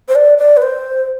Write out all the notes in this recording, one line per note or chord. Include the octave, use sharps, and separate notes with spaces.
C5
D5
D5
B4
C5